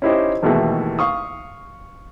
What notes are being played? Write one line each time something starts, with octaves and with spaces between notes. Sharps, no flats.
C#4 D#4 E4 G4 C5 D#5
A1 D#2 B2 E3 G#3 A3
F5 C#6 D#6